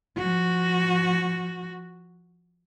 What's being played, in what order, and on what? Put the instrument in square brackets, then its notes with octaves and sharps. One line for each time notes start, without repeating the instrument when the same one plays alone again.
[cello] F3 F#4